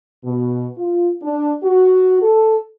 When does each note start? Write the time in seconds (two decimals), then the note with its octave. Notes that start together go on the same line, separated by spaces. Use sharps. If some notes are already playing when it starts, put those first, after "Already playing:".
0.24 B2
0.78 F4
1.22 D4
1.63 F#4
2.22 A4